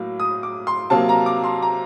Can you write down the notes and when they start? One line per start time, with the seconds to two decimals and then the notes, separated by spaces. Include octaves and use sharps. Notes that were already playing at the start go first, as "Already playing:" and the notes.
Already playing: A2 F#3 A#3
0.20 D#6
0.43 D6
0.67 C6
0.90 C3 F#3 A#3 A5
1.09 A#5
1.26 D6
1.44 C6
1.62 A#5